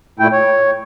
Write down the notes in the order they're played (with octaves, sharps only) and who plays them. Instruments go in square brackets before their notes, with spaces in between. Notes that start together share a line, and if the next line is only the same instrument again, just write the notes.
[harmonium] A#2 A3 E4 G5
C#5